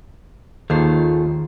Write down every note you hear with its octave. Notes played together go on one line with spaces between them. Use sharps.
D#2 D#3 F4 G#4 A4 C5